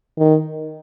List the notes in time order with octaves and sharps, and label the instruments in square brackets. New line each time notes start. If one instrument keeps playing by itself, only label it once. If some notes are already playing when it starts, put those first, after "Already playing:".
[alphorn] D#3